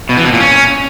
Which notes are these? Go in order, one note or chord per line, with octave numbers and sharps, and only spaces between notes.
B2
E3
B2
A#2
C#4